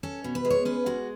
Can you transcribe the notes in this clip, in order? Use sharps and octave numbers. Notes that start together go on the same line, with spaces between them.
C#4 A4
B2
B4
G#3
C#5
C#4 B4
G#3 F#4